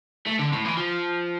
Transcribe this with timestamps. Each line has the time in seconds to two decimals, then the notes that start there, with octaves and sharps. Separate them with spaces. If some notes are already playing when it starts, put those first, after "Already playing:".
0.26 A3
0.39 D3
0.53 A2
0.65 E3
0.77 F3